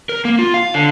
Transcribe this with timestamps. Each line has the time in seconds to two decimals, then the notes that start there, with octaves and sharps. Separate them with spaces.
0.09 A#4
0.25 A#3
0.39 F4
0.54 F5
0.74 D3